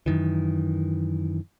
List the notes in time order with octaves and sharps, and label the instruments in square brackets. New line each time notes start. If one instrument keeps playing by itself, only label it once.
[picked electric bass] F#2 D#3 E3